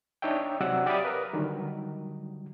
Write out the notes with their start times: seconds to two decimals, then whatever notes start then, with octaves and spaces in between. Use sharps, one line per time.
0.22 D4 D#4 C#5 E5 G5
0.60 C3 F#3 D5 F#5 E6
0.86 G4 D5 E5 F5 B5 D#6
1.05 A#4 B4
1.33 D3 D#3 F#3 G3